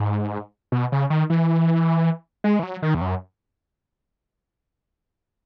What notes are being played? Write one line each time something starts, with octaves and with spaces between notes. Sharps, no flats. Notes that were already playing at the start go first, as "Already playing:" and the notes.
Already playing: G#2
B2
C#3
D#3
E3
G#3
E3
F#3
D#3
E2
F#2